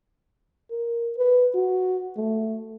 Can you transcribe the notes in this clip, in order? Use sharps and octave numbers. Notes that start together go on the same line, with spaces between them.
A#4
B4
F#4
A3